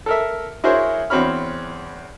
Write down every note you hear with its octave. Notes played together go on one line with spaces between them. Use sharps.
A4 A#4 E5
E4 F#4 G#4 A#4 C5 C#5
E2 C4 F#4 C#5 B5 F6